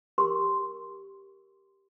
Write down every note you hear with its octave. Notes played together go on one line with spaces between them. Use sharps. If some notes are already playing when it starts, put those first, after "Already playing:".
G4 A#4 C6